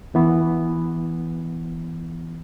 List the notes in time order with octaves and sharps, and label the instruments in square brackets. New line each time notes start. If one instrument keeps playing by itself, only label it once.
[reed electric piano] E2 E3 B3